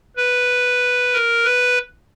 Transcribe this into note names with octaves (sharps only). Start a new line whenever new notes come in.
B4
A#4
B4